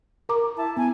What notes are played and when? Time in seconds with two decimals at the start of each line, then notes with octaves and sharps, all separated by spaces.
0.29 A#4 A#5 D6
0.57 E4 A5
0.77 B3 G#5